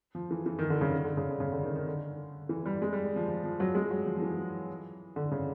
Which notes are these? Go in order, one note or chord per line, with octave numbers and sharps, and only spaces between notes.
F3
E3
E3
D#3
D3
C#3
D3
C#3
D3
C#3
D3
D#3
D#3
D3
E3
G3
G#3
G3
F3
F3
F3
F#3
G#3
F#3
F3
F3
E3
D3
C#3